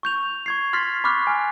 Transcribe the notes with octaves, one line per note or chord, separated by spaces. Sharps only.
C#6 G6 F7
C#6 G#6 C7
C6 F6 A6 B6 C7
B5 C#6 D6 F6 F#6
G#5 F6